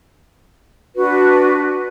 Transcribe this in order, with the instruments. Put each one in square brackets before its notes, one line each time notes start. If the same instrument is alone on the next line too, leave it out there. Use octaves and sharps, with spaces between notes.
[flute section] D4 F#4 B4